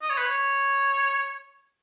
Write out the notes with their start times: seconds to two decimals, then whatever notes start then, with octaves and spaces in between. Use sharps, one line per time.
0.02 D#5
0.10 C#5
0.18 B4
0.26 C#5